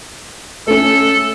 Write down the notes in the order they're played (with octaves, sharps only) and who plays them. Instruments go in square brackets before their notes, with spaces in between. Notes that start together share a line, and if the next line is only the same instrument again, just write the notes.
[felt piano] A3 C#4 [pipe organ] A4